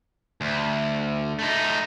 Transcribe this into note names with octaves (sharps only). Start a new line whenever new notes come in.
D2
A3 D#4